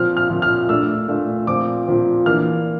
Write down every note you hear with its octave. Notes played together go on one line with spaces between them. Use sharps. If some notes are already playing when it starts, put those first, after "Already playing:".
Already playing: A#2 F3 C4 F6
F6
A#2 F3 C4
F6
A#2 A3 D4 E6
A#2 A3 D4
A#2 F3 C4 D6
A#2 F3 C4
E3 A#3 D4 F6